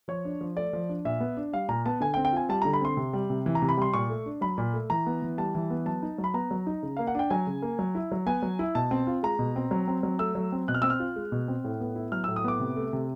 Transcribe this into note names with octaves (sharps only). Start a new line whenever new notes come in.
F3 C#5
D4
F3
A3 D5
F3
D4
A#2 E5
B3
D4
G3 F5
A#2 A#5
B3 A5
D3 G#5
G5
C4
G5
F4 G#5
G3 A5
D3 A#5
B5
C4 C6
C3
G3
C3
E3
A#5
C3
B5
G3 C6
A#2 C#6
A3
D4
F#3 B5
A#2
A3
E3 A#5
B3
E3
G3 A5
E3
B3
F#3 A5
D#4
F#3
B5
B3 A#5
F#3
D#4
C#3
A#3 F5
F#5
D4 G5
F#3 G#5
C#3
A#3
F#3
E4
F#3
B3 G#5
F#3
E4
B2 A5
C4
F4
G#3 A#5
B2
C4
F#3
C4
F#3
A3 E6
F#3
C4
B2 F#6
F6
C4 E6
F6
F4
G#3
B2
C4
A2
B3
E4
F#3 F6
E6
A2
D#6
B3 D6
C3
A3
C3